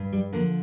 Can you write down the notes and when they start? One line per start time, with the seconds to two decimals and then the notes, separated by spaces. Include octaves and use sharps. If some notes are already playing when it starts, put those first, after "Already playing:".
Already playing: G2
0.12 G3
0.33 D3 F3 A#3